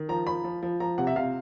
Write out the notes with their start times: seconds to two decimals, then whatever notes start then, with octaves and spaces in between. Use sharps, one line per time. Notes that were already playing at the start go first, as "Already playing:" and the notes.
Already playing: D#3
0.09 F3 A#5
0.27 F3 B5
0.44 F3
0.63 F3
0.80 F3 A#5
0.98 C3 F#5
1.07 E5
1.16 C3 F5